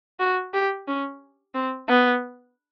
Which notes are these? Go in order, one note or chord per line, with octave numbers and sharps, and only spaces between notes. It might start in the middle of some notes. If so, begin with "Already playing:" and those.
F#4
G4
C#4
C4
B3